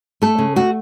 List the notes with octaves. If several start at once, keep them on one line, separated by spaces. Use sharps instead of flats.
A3 A4
C#3
A3 F#4